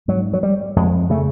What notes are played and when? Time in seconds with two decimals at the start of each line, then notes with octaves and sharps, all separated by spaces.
0.08 G#2 F#3
0.33 F#3
0.43 G3
0.76 F2 G#3
1.10 C#3 A3